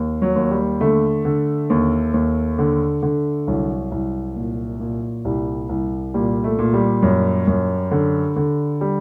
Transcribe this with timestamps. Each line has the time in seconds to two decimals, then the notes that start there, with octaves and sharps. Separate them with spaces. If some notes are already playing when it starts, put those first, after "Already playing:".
Already playing: D#2
0.22 F#3
0.36 D#2
0.51 G3
0.81 D3 A3
1.25 D3
1.70 D#2
2.14 D#2
2.59 D3
3.03 D3
3.47 C2 F#3
3.92 C2
4.36 A#2
4.80 A#2
5.25 C2 G3
5.69 C2
6.14 A#2 G3
6.44 A3
6.59 A#2
6.73 G3
7.03 F#2
7.47 F#2
7.91 D3
8.36 D3
8.81 G3